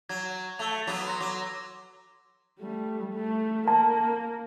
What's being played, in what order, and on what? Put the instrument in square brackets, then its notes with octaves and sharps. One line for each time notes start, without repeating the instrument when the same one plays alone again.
[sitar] F#3 [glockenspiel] G#6
[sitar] A3 [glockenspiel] E6 F7
[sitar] F#3 B3
[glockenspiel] A#5 C6 A#6
[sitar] F#3 [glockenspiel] D6 A#6
[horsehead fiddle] G3 A3
A3
[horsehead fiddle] A#3 [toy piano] A5